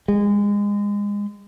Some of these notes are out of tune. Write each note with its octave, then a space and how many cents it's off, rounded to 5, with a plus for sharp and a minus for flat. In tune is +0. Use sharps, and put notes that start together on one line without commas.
G#3 -25